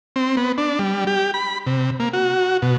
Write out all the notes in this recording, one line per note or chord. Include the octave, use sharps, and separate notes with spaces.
C4
B3
D4
G3
G4
B5
C3
A#3
F#4
B2